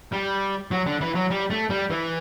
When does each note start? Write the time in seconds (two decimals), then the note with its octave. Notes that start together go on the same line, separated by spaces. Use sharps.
0.12 G3
0.71 F#3
0.86 D3
1.01 E3
1.15 F#3
1.31 G3
1.50 A3
1.70 G3
1.90 E3